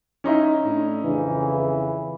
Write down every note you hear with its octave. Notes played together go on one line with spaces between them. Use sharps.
C#4 D#4 E4
A2 D4
F2 C#3 E3